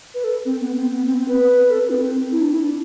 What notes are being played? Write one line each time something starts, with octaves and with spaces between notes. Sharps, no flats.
B4
A4
C4
B3
C4
B3
C4
C4
B4
A4
B4
C4
C4
E4
D4
E4
D4